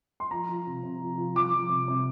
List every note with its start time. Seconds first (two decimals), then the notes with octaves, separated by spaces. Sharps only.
0.20 C6
0.31 F3 A#5
0.49 F3
0.67 C3
0.83 C3
1.01 F3
1.18 F3
1.35 F3 D6
1.53 F3
1.70 C3
1.88 C3